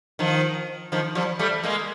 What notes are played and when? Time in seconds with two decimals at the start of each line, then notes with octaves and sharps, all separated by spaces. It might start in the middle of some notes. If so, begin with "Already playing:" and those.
0.19 D#3 F3
0.92 D#3 F3
1.15 F3 G3
1.39 G3 A3
1.63 G#3 A#3